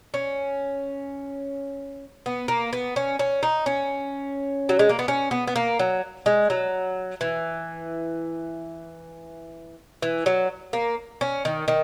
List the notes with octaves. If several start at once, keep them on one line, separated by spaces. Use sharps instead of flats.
C#4
B3
A#3
B3
C#4
C#4
D#4
C#4
F#3
G#3
A#3
B3
C#4
B3
B3
A#3
F#3
G#3
F#3
E3
E3
F#3
A#3
C#4
D#3
D#3